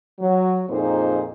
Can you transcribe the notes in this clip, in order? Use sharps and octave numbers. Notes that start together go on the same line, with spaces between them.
F#3
F2 A#2 D#4 G#4 C5